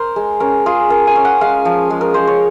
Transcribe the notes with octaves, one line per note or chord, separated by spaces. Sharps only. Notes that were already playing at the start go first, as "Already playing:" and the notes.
Already playing: A#4 C5
G#3
C#4 A#4
F4 G#4
F4 A#4
G#5
C#4
F#5
G#3 F5
F3
G#3
A#4
G#3 C5
C#5